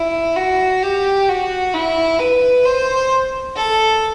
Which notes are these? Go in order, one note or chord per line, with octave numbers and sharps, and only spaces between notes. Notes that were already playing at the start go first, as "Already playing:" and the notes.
Already playing: E4
F#4
G4
F#4
E4
B4
C5
A4